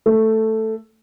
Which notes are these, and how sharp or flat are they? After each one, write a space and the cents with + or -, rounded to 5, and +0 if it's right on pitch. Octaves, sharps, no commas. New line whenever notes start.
A3 +5